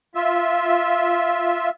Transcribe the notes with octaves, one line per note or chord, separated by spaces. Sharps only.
F4 E5